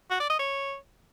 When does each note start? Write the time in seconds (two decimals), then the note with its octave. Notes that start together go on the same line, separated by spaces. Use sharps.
0.10 F#4
0.20 D5
0.30 D#5
0.39 C#5